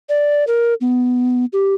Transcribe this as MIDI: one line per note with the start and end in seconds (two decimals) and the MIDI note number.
0.09 0.44 74
0.47 0.74 70
0.81 1.45 59
1.53 1.75 67